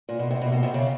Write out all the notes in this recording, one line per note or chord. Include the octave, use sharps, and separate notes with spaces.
A#2
B2
C3
B2
B2
C3
C#3